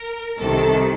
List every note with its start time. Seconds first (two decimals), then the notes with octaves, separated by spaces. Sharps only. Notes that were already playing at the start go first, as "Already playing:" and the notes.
Already playing: A#4
0.39 C2 C3 D#3 A4